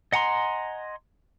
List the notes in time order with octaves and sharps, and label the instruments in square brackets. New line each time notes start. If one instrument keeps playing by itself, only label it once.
[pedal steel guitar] D#5 F#5 G#5 A#5 C6